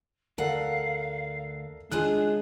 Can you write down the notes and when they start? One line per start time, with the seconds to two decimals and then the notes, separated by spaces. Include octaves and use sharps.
0.38 D2 A4 A#4 F5 F#5
1.92 C#3 G#3 D4 F4 G#4 F#6